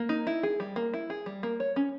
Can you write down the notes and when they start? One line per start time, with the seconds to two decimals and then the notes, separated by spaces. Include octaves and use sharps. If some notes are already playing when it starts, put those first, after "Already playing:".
Already playing: A#3
0.09 D#4
0.27 E4
0.43 G#4
0.60 G3
0.76 A#3
0.93 E4
1.10 G#4
1.26 G3
1.43 A#3
1.60 C#5
1.76 C#4